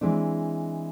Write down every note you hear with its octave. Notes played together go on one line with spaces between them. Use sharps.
E3 G#3 C4 D4